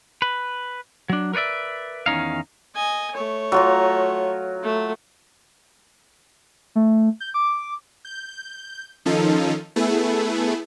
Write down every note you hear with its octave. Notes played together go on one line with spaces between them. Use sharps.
B4
F#3 D4
A#4 B4 C#5 D5 E5
E2 D#3 C#4 D#4 F5
D#5 G#5
A3 C#5
F#3 F4 A#5
A3
A3
G6
D6
G6
D#3 F3 C#4 D#4 F4 A4
A3 B3 E4 G#4 A4